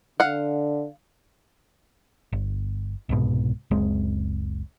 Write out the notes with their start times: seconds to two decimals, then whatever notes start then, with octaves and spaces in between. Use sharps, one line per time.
0.20 D3 F5 F#5
2.33 G1
3.09 C2 G#2 B2
3.71 F#1 C#2 G#3 C4